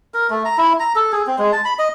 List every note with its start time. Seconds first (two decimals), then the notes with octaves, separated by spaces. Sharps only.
0.14 A#4
0.30 A3
0.45 A#5
0.58 E4
0.80 A#5
0.95 A4
1.12 G#4
1.27 C4
1.38 G#3
1.53 A5
1.65 B5
1.79 D#5